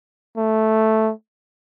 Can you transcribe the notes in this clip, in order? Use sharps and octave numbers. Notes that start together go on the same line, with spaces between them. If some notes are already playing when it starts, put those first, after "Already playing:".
A3